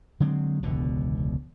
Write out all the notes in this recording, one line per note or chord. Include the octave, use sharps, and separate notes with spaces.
D3 F#3 G#3 C4
E1 C#2 B2 D3